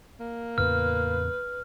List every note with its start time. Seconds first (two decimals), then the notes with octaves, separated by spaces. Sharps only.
0.20 A#3
0.58 E2 A2 C#3 B4 F6